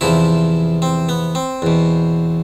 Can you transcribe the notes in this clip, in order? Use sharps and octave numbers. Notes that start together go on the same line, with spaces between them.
E2 C3 F3 E4
C4
B3
C4
E2 B2